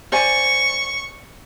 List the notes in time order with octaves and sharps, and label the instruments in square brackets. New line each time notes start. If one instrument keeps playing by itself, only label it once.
[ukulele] C5 D5 G#5 [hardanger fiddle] C#6